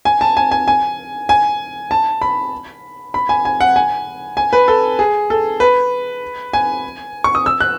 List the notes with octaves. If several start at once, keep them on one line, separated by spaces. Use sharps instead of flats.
G#5
A5
G#5
G#5
G#5
G#5
A5
B5
B5
G#5
G#5
F#5
G#5
G#5
B4
A4
G#4
A4
B4
G#5
C#6
D#6
E6
F#6